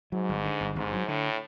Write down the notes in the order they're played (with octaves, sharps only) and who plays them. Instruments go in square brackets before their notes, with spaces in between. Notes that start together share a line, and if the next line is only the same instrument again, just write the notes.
[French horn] G#2 [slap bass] F#3
[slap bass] G1
D3
G1
[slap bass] G1 [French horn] G#2
[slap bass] F#3
[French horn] A2 [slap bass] D3